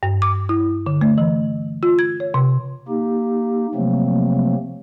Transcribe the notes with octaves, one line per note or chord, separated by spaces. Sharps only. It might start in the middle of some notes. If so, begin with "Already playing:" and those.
G2
D6
E4
D3
A3
E3
F4
G#6
C#5
C3
A#3 D#4 G4
C3 F3 F#3 A3 A#3 C4